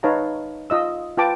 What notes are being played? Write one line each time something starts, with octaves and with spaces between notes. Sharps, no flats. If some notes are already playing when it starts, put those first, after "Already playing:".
D#4 B4 C#5 F5 A5 A#5
F4 D#5 E6
F4 B4 G5 A5 D6